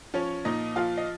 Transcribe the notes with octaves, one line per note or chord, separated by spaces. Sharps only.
F3 C#4 C#5
A#2 D#4 D#5
F3 F4 F5
D#5